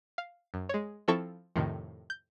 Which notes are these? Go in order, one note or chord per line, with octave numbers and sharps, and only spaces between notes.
F5
F#2
G#3 C#5
F3 C4 E4 A4 C#6
F2 A2 C3 D#3
G6